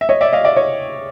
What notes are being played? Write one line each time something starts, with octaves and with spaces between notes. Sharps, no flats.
E5
C#5 D#5
D5 E5
D#5 F5
D5 E5
C#5 D#5